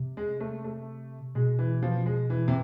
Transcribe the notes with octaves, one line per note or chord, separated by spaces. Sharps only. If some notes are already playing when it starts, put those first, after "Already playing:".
Already playing: C3
G#3
A3
A3
B2 G#3
E3
F3
G#3
E3
C3